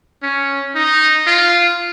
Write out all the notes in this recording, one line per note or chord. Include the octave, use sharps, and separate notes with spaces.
C#4
D#4
F4